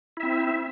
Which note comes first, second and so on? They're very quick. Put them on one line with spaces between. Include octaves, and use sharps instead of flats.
E4 E5 C4